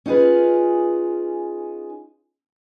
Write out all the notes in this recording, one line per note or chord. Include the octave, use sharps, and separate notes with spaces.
C#4 D#4 F4 G#4 B4